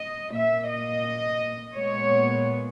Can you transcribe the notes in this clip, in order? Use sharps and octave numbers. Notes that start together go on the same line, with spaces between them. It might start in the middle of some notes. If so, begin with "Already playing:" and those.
Already playing: D#5
A#2 A#3 E5
D#5
A#2 G#3 B3 C#5